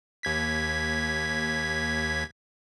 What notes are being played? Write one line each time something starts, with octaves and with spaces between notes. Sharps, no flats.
D#2 G#6 B6